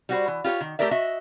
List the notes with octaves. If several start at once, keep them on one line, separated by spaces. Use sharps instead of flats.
G3 F#4 C5
E3
F4 G4 B4 C#5
D#3
A3 G4 A4 A#4 D5 E5
F#4 D#5 E5